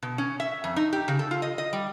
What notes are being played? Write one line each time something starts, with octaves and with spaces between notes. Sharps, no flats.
B2
C#4
E5
F2
D#4
G4
C#3
A4
F4
D#5
D#5
G3